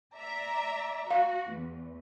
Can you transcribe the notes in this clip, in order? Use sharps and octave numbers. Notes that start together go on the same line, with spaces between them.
D5 E5 A#5
F#4 F5
E2